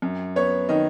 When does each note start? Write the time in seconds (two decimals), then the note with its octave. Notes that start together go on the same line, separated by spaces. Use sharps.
0.02 F#2
0.36 B3 C#5
0.69 D#3 D#5